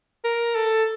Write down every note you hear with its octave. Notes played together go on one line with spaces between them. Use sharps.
A#4
A4